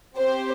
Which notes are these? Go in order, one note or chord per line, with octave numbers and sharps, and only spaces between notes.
C4 G4 C5